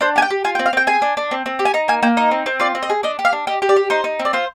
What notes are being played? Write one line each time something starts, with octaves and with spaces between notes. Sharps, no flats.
D4 C5
G4 G#5
G5
G4
F4 G#5
G5
C4
F5
C4 G5
G#4 G#5
D4
D4
C4
C4
G4
G#5
D#4 A#5
A#3 G#5
A#3 G5
D#4 D#5
C4
C4
F4 D5
C4
D#5
G#4
D4 D#5
G4
F5
D4
G4 D#5
G4
D5
G4
D#4 C5
D#4
C4
D5
F4 C5